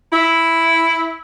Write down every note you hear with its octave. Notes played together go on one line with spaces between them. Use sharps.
E4